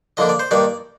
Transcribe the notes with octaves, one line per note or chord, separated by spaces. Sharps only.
D3 F3 A#3 D4 D#5
D5
C5
G2 D#3 A#3 D4 D5